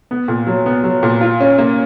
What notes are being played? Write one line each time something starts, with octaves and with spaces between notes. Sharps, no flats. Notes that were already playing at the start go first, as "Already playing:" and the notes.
B3
A#2
F#3
B3
F#3
A#2
F4
C#4
A#3